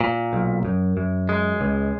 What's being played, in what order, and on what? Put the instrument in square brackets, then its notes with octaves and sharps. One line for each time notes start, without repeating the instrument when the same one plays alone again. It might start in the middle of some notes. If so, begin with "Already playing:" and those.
[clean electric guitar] A#2
B1
F#2
F#2
G#3
C#2